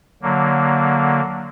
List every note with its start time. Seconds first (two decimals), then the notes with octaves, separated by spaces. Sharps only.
0.22 D3 F#3 A#3